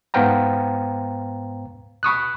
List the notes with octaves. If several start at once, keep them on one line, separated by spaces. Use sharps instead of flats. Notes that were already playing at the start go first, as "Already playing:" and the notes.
G#2 B3 C5 F5 G5 A#5
B5 C#6 D#6 F#6